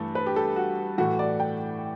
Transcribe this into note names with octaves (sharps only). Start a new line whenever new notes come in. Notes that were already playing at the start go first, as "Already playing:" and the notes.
Already playing: G2 E3 A3 A4
B4
G4
A4
F#4
A2 E3 A3 F#4
D5
G5